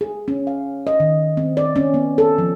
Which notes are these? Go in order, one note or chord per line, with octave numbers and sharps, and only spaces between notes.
G#4
C#4
F5
D#5
D#3
C4
D5
C#4
B3
A4
F3